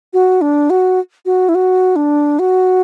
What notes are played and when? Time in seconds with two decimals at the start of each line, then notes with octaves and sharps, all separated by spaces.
0.13 F#4
0.41 D4
0.70 F#4
1.26 F#4
1.49 E4
1.55 F#4
1.96 D4
2.39 F#4